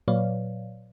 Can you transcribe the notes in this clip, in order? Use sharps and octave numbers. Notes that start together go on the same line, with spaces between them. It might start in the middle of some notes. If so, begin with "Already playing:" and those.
A#2 F#3 B4 C#5 D5 F5